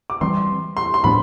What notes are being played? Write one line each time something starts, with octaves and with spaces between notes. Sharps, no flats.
D6
E3 G3 C4 C6
C6
C6
A2 F3 B3 D4 B5